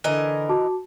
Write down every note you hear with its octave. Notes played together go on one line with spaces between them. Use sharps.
D3 E3 A#4 D#5
F#4 A5 D6